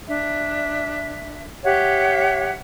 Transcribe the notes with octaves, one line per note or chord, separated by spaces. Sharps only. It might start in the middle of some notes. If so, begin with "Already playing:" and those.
D4 E5
G4 C#5 E5 F#5